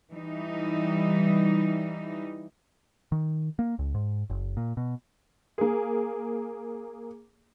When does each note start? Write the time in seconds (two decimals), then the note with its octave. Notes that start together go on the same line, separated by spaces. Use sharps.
0.13 E3 G3 D#4
3.12 D#3
3.59 A#3
3.79 C#2
3.94 G#2
4.30 F#1
4.57 A#2
4.77 B2
5.58 A#3 G#4